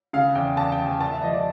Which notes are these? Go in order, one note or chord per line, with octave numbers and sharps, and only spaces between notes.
C#3 F5
E2 G5
E2 A5
G5
F1
G#5
A#2 A5
E5
F3 D#5
D5